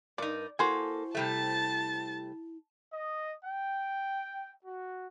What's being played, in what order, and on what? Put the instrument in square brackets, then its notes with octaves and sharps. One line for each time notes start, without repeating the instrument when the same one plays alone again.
[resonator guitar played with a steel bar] G2 D#4 [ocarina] A#4 [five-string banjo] D5
[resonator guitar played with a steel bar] A#3 A4 [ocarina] E4 [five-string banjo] F#4 C5 G#5
[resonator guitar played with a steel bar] C3 G3 A3 [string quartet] A5 A6
[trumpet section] D#5
G5
F#4